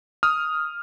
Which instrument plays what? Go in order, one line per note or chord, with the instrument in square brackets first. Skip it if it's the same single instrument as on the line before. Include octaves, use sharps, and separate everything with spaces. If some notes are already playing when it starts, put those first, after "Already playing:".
[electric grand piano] D#6 F6